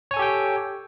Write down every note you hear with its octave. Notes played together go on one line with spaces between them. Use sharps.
G4 A4 C#5 G5 G#5